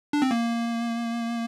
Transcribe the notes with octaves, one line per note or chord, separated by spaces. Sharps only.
D4
C4
A#3